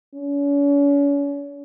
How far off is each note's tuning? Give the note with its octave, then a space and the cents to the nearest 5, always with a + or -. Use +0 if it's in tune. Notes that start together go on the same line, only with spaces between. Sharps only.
C#4 +40